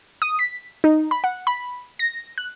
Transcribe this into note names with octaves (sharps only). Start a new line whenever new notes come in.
D#6
B6
D#4
B5
F#5
B5
A#6
F#6